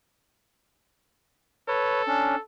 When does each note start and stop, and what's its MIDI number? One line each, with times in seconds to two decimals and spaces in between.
1.68 2.42 69
1.68 2.02 71
1.68 2.02 73
2.08 2.35 61
2.08 2.35 62